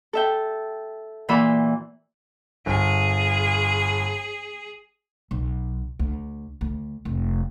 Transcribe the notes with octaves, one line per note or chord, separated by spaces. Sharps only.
A4 E5 G5
A#2 E3 F#4 E5 B5
G1 G#4
B1
D2
D2
F1